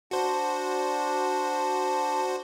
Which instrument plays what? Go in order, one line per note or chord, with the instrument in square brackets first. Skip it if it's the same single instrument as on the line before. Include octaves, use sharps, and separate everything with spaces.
[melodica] D4 [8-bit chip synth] F#4 C5